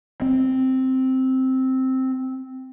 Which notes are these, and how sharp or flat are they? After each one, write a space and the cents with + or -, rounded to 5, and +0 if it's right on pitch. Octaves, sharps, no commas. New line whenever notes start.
C4 +0